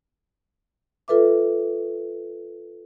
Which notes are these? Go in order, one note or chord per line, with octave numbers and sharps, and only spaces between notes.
F4 A4 B4 E5 D6